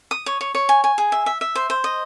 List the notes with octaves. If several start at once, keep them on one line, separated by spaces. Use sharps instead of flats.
D#6
C#5
C#5
C#5
G#5
G#5
G#4
E5
E5
E5
C5
C5
D#5